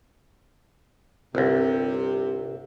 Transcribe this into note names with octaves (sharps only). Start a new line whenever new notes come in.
G1 C2 C3